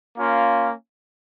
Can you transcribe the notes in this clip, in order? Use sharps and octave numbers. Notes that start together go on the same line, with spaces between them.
A#3 C#4 F4